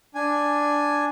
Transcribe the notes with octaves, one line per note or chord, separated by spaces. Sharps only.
D4 G#5